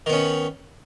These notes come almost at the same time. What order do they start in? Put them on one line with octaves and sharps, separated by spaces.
D#3 B3 C#4